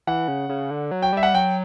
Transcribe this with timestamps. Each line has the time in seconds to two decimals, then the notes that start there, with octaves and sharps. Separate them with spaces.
0.07 E3 F#5
0.28 C#3
0.49 C#3
0.71 D3
0.91 F#3
1.02 G5
1.13 G3 E5
1.23 F#5
1.34 F#3 G5